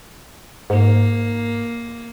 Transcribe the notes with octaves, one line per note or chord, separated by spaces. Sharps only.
G#2 A#3